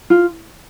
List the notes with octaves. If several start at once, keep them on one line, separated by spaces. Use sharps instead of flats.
F4